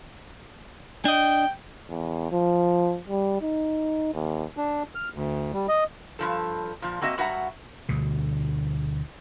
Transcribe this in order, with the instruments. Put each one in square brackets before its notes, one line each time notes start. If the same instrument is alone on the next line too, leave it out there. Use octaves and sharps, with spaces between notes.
[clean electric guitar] D4 D#5 [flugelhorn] G5
[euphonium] E2
F3
G3
D#4
D#2
[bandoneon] D4
F6
D2
G3
D#5
[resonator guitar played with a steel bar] G2 F3 A4
A#2 F3
A#3 C4 F#4 D#5 E5
G2 F#4 E5 F#5 A#5
[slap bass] D2 B2 D3